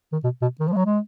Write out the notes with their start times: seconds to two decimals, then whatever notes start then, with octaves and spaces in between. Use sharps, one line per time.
0.13 D#3
0.24 B2
0.42 B2
0.60 D#3
0.68 F3
0.72 G#3
0.76 F#3
0.86 G#3